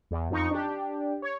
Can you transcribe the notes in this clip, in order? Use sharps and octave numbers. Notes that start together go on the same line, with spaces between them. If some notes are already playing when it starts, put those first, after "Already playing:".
E2
F2 D#4 C#6
D4 G4
C#5